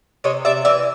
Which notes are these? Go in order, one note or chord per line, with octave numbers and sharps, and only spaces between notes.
C3 C#5 D#5
C3 D5 E5
E3 D5 E5